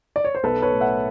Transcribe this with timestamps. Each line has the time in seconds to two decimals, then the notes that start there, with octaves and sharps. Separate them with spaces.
0.16 D5
0.25 C#5
0.35 C5
0.43 B1 A4 B4
0.62 B4 C#5
0.72 A2
0.81 E5 F#5